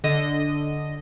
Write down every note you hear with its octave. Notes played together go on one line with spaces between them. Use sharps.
D3 D#5